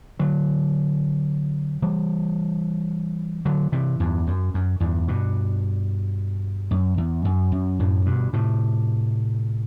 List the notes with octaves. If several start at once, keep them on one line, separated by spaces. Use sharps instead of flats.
D3 F#3
E3 G3
D3 F#3
C3 E3
E2 G2
F#2
F#2
E2 G2
G2 B2
F#2
E2
F#2
F#2
F#2 A2
G2 B2
A2 C3